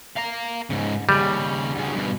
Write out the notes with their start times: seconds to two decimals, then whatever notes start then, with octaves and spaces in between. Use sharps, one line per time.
0.17 F5 A#5
0.70 G#2 C#3
1.09 D#2 C#3 G3
1.74 D2 C#3
1.94 G2 B2